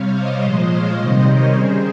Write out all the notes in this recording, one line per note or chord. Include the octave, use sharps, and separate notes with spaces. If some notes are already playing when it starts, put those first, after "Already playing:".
Already playing: C3 G3 C#5 F5
C5 D#5
A#2 F3 G#3 C5 D#5
C#5 F5
C3 D#3 G3 C5 D#5
A#4 C#5
C#3 G3 G#4 C5